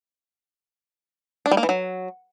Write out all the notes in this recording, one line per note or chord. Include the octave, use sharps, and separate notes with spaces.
D4
G3
A#3
E3
F#3